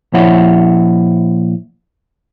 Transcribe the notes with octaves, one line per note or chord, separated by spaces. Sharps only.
A#2 F3 E4 C#5 E5 F#5